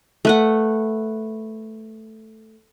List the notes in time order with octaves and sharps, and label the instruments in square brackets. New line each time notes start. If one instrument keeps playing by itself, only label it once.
[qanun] A3 B4 F#5